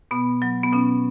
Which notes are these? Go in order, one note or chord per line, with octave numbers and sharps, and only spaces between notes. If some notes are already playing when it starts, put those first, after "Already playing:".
B2 B3
F#3
B3
B2 C#4